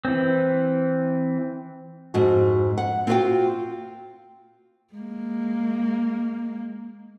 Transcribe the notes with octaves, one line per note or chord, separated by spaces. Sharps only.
E3 C4
F2 G#2 F#4
F#5
C4 F4 F#4 A#4 F5 G5
G#3 A#3